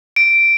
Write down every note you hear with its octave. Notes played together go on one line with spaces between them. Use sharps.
D7